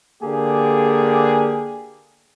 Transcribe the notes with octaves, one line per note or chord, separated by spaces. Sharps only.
D3 A#3 G4 G#4